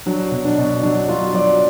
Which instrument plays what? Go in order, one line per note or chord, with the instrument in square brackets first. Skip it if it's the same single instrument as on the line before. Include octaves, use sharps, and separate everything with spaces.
[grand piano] F#3 D4
B2
D4
B2
F#3 D4
F#3 F4
F#3 D5